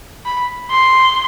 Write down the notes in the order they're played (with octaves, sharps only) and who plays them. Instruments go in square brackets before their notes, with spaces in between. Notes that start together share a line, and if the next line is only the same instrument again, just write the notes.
[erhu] B5
C6